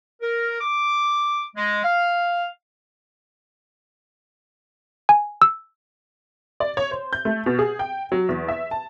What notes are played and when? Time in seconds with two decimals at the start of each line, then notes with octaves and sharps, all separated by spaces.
0.22 A#4
0.61 D6
1.56 G#3
1.84 F5
5.09 G#5
5.42 E6
6.60 D5
6.77 C#5
6.91 C5
7.13 G6
7.25 A3
7.46 B2
7.59 G#4
7.79 G5
8.12 F#3
8.29 E2
8.49 E5
8.71 A5